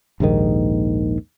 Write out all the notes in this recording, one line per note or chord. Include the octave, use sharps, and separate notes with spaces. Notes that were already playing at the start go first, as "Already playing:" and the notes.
A#1 D#2 G#2 D#3